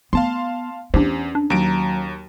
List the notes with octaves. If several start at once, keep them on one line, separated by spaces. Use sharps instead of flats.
B3 F5 A5 C6
E2 C#4 D4 G4 C5
D4
D#2 F#3 A#5 D7